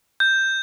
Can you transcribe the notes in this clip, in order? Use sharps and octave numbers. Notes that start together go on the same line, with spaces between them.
G6